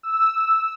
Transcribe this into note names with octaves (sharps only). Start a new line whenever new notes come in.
E6